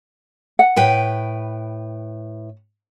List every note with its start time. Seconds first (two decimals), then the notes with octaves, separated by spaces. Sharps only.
0.59 F#5
0.76 A2 B4 G5